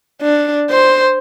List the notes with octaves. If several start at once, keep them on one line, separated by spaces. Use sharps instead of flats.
D4
C5